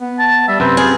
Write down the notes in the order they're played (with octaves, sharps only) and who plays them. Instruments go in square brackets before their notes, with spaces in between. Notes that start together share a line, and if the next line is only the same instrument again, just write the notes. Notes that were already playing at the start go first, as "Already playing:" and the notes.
[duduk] B3
[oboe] A5
[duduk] G3 [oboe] E5
[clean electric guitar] F#2 C3 [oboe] C4 [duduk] B4
[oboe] F4 [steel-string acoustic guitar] G#4